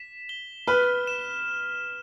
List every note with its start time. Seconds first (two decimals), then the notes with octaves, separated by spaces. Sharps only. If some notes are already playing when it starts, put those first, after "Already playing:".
Already playing: B6 E7
0.29 G7
0.67 B4 F6
1.07 E7